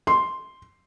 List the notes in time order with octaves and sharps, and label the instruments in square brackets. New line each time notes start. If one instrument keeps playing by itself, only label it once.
[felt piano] C6